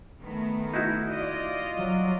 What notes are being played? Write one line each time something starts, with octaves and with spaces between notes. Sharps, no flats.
D#3 A3 B3
D#4 E4 F#4
F4 D5 D#5
F#3